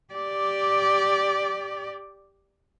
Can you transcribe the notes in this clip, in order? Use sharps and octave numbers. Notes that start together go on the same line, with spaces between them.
G4 D5